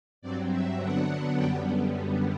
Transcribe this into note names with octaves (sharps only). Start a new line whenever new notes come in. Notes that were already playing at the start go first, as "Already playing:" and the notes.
G2 F#3 C4 D5
E5
D3 F#3 B3 D4 F#5
F#2 D3 G3 B3 G5